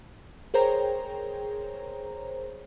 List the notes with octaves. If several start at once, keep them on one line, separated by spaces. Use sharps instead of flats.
G#4 A#4 C5 C#5 G5 A#5